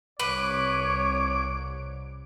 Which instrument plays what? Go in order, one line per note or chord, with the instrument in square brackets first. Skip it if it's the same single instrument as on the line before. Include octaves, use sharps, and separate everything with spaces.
[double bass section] C2 [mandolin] B4 [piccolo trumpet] C#5 [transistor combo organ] D6